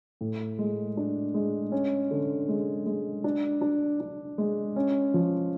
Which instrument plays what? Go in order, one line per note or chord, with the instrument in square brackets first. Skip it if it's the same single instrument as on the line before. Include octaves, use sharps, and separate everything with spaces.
[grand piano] A2
G#3
D4
G#3
C#4
D3
G#3
G#3
D4
D4
D4
G#3
C#4
F3